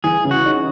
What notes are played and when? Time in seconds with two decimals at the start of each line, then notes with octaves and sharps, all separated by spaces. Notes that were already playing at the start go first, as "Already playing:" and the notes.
0.04 E3 G#4
0.25 C#3
0.31 F#4
0.45 D#4